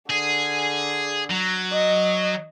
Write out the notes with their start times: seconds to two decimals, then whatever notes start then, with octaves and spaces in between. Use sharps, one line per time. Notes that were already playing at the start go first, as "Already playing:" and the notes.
0.10 D3 G#4
1.31 F#3
1.73 D#5